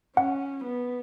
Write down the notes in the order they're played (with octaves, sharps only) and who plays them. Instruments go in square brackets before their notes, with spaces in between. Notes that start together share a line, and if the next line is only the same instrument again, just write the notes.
[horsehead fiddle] C#4 [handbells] F#5
[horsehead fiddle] B3